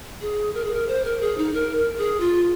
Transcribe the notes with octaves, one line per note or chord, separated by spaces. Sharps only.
G#4
A#4
G#4
A#4
C5
A#4
G#4
D#4
A#4
A#4
G#4
F4